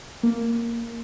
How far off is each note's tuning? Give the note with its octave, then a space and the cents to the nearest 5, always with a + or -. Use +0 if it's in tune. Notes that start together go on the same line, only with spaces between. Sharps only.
A#3 -5